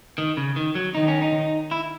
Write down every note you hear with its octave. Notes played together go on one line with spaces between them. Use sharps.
D#3
C#3
D#3
F#3
D#3 D#4
C#4
D#4
E4